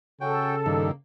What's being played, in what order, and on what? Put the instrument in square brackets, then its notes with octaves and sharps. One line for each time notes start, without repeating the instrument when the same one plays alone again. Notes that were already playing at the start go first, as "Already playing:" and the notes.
[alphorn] C#3 [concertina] C#4 F#4 G5 [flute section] A4
[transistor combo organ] G2 D#3 [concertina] A#3